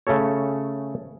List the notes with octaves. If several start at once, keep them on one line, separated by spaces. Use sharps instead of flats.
C#3 A3 C#4 A4 C#5